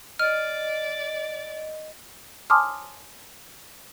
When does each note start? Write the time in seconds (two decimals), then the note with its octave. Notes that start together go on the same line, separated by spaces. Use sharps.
0.19 D5 D#5 F6
2.50 G#5 A5 C6 D6 D#6 F6